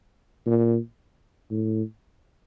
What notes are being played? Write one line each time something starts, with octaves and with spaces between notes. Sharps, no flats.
A#2
A2